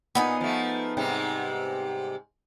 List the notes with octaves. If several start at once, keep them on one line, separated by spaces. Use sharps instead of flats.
A#2 B3 D#4 G#4
F3 A3
G#2 C3 G3